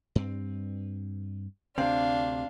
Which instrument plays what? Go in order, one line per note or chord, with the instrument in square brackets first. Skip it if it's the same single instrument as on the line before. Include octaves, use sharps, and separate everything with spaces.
[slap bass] G2 C4
[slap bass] D2 C4 [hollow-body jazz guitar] C3 [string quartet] D4 F5